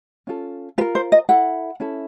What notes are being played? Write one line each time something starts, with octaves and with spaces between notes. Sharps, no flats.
C#4 F4 A4
F4 A#4 B4
C5
D#5
E4 A4 F#5
C#4 E4 A4